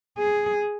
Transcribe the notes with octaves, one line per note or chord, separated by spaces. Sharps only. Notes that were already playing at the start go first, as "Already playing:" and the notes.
G#4